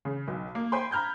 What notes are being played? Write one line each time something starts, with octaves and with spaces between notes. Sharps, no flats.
C#3
B1
A#3
C5 G5 G#5 B5 C6
A#5 B5 F6 G6 G#6